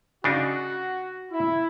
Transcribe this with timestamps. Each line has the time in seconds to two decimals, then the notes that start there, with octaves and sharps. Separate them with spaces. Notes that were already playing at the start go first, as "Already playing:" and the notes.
0.24 C#3 D4 D#4 F#4
1.31 E4